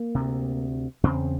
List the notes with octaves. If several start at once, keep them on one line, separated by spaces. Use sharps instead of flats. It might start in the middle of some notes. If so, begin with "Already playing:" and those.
Already playing: A#3
D2 C3
E2 C#3 C4